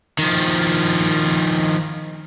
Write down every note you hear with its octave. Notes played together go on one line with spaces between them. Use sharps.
D#3 F3